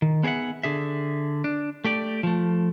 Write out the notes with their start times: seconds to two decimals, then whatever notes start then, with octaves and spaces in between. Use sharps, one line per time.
0.02 D#3
0.23 B3 G#4 C#5 E5 F#5
0.63 D3 G#4 E5
1.44 D4
1.85 A3 G4 D5
2.23 F3 A3